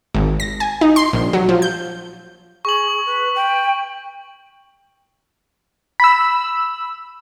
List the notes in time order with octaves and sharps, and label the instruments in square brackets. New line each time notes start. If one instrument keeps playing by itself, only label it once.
[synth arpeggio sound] G#1
A#6
G#5
D#4
C6
A#1
F#3
F3
G6
[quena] G#4 [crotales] C#6 F#7
[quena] B4
G5
[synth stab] B5 E6